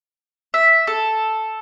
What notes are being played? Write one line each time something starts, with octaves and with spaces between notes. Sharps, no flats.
E5
A4